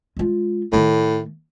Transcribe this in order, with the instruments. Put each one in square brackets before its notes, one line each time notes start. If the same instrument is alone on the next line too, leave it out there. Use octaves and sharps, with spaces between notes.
[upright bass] G#3 F4
[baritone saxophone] A2 [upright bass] D#3 A3